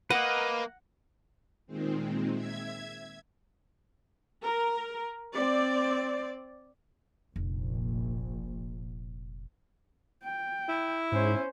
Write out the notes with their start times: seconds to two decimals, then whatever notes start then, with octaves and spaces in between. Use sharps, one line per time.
0.10 A#3 B4 D#5 F#5
1.67 A#2 D#3 G#3 C4
2.32 E5 G#6
4.44 A#4
5.34 C4 D5
7.36 F1 A#1
10.24 G5
10.69 E4
11.12 G#2 C#4 C5